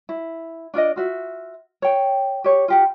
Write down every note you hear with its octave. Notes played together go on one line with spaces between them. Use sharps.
E4
D4 F4 D5 D#5
F4 F#4 E5
C#5 G5
G4 C#5
F4 G4 F#5